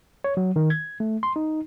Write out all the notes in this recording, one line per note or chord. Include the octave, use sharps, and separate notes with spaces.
C#5
F#3
D#3
G#6
A3
C6
D#4